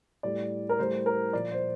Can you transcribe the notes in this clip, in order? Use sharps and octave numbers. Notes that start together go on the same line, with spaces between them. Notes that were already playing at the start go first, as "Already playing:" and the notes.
A2 G3 D5
A#4
A2 G3 C5
A#4
A#2 F3 D5
C5